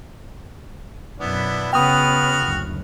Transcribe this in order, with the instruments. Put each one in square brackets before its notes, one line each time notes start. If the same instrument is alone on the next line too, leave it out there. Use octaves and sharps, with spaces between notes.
[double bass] F#2 B2 [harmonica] B3 D4 E4
[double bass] C#3 [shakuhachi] B3 [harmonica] F#4 F6 [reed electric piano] G5 D#6
[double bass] F#1 D2